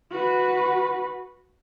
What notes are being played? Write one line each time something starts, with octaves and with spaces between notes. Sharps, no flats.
F#4 B4